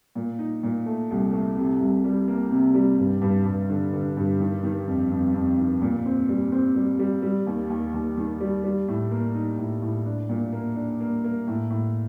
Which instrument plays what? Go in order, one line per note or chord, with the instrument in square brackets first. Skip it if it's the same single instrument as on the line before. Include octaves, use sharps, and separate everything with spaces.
[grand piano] A#2
D#4
A#2
A3
C2
A3
C3
C2
G3
A#3
C3
G3
G2
G2
G2
D3
D3
G2
D#3
D#3
F2
F2
F2
D#3
A#2
C4
G3
C4
G3
G3
G3
D#2
D#2
D#2
D#3
G3
G3
A2
A#3
D#4
A2
A2
D4
A#2
A#3
D4
A#3
A#3
A2
A2